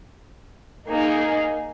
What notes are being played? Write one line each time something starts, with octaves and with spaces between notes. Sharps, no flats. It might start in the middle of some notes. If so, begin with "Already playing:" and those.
A#3 D#4 G#4